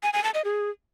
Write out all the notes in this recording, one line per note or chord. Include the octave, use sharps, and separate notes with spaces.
G#5
G#5
A5
D#5
G#4